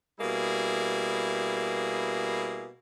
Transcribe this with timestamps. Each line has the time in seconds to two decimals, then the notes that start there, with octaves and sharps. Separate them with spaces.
0.20 B2 G3 A#3 E4 G#4